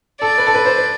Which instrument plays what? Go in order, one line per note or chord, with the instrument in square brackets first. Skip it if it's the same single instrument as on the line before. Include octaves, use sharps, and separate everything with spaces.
[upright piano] A4 [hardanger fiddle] D5
[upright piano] B4
A4
B4
C5
C5